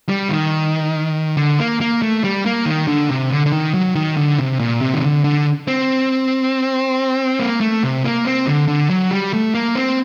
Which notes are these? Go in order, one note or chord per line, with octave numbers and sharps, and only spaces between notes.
G3
D#3
D3
A#3
A#3
A3
G3
A#3
D#3
D3
C3
D3
D3
D#3
F#3
D#3
D3
C3
A#2
C3
D#3
D3
D3
C4
A#3
A3
C3
A#3
C4
D3
D3
F#3
G3
A3
A#3
C4